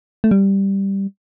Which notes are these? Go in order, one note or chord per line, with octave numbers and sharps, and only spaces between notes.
A3
G3